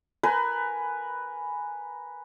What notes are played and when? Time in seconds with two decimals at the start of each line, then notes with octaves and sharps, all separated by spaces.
0.23 A#4 B4 G#5